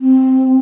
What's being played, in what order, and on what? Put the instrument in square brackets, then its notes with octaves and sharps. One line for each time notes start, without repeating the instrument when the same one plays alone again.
[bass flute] C4